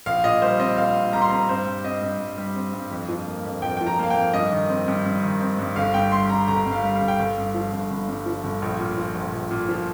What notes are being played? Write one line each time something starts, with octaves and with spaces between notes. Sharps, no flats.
A#1 F5
A#2 D#5
G3 C5
C4 D#5
A#1 F5
A#2
G3 A#5
C6
C4 A#5
G2 C5
G3
C4 D#5
G2
G2
G3
C4
G2
F2
F3
A#3
F2
F2 G5
F3 G5
A#5
A#3 F5
G5
F2
G2 D#5
D#3
C4
G2
G2
D#3
C4
G2
G1 F5
G2 G5
G3 C6
G1 A#5
G1 A#5
G2
F5
G3
F5
G1
G5
G1 F5
G2
F3
G1
G1
G2
F3
G1
A#1
A#2
F3
A#1
A#1
A#2
F3